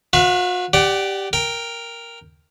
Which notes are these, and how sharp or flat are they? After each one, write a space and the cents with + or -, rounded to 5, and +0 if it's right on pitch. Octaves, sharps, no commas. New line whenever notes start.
F#4 -45 B4 -15 E5 +40
G4 +0 D5 +0 F#5 +30
A#4 +0 G5 +15